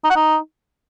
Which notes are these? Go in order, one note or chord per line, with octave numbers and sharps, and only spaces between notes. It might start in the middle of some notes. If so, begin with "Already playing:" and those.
D#4
F#5
D#4